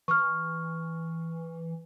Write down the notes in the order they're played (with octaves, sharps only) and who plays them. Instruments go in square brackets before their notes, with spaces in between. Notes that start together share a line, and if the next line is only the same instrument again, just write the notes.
[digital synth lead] E3 [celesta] C#6 F6